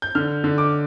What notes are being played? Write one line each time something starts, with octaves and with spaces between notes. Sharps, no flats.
G6
D3 F6
D3
D6